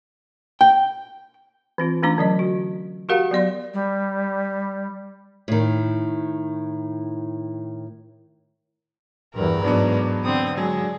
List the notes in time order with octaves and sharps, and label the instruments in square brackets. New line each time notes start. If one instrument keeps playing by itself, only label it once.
[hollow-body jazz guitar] G5
[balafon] E3 C4 F4
E3 A3 C#4 D4 D6
D3 F#3 D#5
F#4
F#4 G4 A#4 F5 F#5
F#3 B3 D5 C6
[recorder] G3
[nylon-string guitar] A2 D#3
[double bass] E2 G2 [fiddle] A#4 B4
[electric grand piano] E2 F#3 B3 [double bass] G#2 D4
[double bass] D3 [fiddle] C4 D#6
[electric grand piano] F#3 G#3 [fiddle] G#4